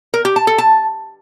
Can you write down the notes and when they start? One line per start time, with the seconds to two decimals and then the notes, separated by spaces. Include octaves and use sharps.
0.14 A#4
0.25 G4
0.36 A5
0.47 A4
0.58 A5